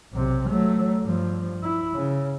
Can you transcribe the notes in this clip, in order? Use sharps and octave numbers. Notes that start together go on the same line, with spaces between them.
B1 C3
F#3 A3
G2 F3
E4
C#3